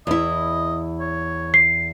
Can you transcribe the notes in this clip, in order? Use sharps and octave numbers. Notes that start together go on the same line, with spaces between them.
E2 E4 D#5
C#5
C7